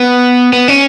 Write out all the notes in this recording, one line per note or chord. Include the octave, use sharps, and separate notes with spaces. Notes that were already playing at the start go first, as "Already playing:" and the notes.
Already playing: B3
B3
C#4